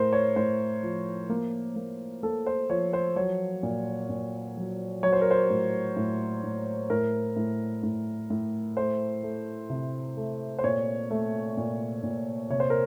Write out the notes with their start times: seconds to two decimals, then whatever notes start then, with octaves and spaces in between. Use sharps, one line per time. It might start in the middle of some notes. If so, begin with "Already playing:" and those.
Already playing: A2 A3 A#4 C5
0.13 C#5
0.36 A2 C5
0.83 F3
1.30 A#3
1.76 A#3
2.23 A#3 A4
2.46 C5
2.69 F3 C#5
2.93 C5
3.16 F#3 C#5
3.63 A#2
4.10 A#2
4.57 F#3
5.03 F#3 C#5
5.13 C5
5.21 A#4
5.31 C5
5.50 A2
5.96 A2
6.44 A2
6.90 A2 A#4
7.36 A2
7.83 A2
8.30 A2
8.77 A3 C5
9.23 A3
9.70 C3
10.17 A3
10.59 C5
10.64 A#2 C#5
11.10 A3
11.57 A#2
12.03 A#2
12.50 C3 C#5
12.60 C5
12.70 A#4